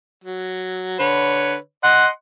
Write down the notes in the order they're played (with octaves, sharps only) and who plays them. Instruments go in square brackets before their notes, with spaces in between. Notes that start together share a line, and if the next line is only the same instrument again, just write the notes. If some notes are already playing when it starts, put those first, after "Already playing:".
[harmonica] F#3
D3 B4 C#5
[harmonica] D#5 C6 [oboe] F#5